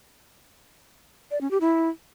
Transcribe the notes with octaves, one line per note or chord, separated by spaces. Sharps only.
D5
C#4
G4
E4